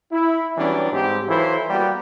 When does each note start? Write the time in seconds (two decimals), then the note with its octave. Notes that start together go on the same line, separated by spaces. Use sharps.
0.12 E4
0.57 E3 F#3 G3 B3 C#4 D4
0.92 G#2 G3 C4 G4
1.28 E3 F#3 E4 F4 A4 C5
1.69 G3 A#3 B3 F#4 G4